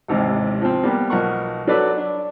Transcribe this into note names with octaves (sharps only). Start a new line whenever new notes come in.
A1 D#2 G#2 C3
F3 C4
G3 A#3 B3
B1 F3 A#4 F#5 C#6
F#3 D4 A4 B4 D5
D4